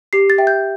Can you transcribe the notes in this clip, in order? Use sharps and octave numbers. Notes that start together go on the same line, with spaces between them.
G4 C7
A6
E5 G5
G6